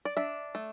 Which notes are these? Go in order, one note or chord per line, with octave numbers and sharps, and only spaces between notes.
D5
D4 E5
A3